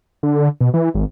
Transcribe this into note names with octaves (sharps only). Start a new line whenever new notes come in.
D3
B2
E3
G#1